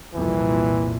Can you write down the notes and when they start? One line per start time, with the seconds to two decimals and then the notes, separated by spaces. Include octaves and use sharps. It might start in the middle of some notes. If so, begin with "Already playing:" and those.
0.15 C2 F2 A#2 E3